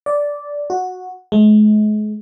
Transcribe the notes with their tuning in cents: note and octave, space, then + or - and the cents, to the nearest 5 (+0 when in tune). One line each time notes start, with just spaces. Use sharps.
D5 -10
F#4 -10
G#3 +40